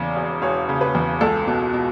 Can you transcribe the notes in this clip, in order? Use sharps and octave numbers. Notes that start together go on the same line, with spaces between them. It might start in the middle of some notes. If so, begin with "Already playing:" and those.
Already playing: E2 C#3 D5
E1
E1 C#5
C#3
B4
E2
C#2 A4
B2
B2